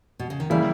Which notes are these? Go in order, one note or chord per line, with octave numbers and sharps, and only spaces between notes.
B2
C#3
D#3
C#3 E3 G3 A#3 E4